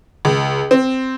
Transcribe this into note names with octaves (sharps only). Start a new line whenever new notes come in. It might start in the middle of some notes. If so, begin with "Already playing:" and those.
C#2
C4